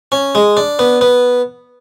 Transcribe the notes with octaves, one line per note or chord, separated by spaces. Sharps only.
C#4
G#3
D4
B3
B3